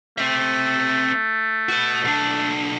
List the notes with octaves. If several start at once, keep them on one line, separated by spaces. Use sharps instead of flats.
A3 C4 E5
F#4 B4
B1 D4